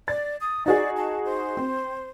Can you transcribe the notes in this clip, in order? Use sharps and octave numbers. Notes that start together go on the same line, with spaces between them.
D5 A6
D#6
D#4 F#4 G#4 D5
A5
C5
C4